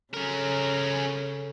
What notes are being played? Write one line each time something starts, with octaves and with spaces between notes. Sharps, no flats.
C#3 C#4 A4 A#4